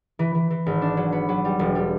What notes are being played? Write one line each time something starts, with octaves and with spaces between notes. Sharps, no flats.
E3
E3
E3
G#1
D4
F#3
B3
F#3
G3
E1
G3